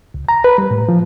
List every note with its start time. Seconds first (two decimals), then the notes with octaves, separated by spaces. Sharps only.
0.14 C#2
0.29 A#5
0.44 B4
0.58 G3
0.71 A2
0.89 F3